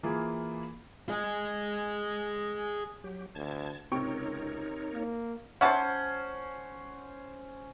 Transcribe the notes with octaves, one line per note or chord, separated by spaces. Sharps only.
E3 A#3 E4 F4 G#4
G#4 D#5
F#3 G4
D2 A5 G#6
C#2 C3 D#4 A#4 C#5 G5 C#6
A#3
C#4 B4 C5 E5 F#5 A5